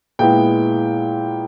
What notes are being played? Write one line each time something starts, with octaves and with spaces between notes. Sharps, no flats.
A#2 G#3 B3 E4 G5